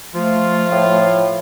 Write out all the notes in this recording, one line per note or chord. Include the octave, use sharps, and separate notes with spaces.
F3 A3 F4
A2